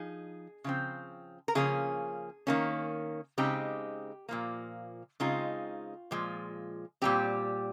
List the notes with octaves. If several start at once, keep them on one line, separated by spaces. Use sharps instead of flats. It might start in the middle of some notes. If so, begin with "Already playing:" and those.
Already playing: F3 D#4 G#4
C#3 F3 C4
A#4
C#3 F3 A#3 C#4 G#4
D#3 A#3 C#4
C#3 G#3 C4 D#4 G4
A#2 F3 A#3
C#3 G#3 C4 D#4 F4
A#2 F3 G#3
A#2 G3 C4 G4